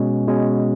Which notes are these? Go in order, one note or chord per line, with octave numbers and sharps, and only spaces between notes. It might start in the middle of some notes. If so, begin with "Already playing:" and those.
Already playing: B2 G#3 C#4
B2 G#3 C#4